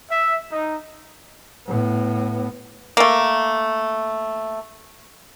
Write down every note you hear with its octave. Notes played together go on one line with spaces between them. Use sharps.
E5
D#4
A2 B3
A3 A#3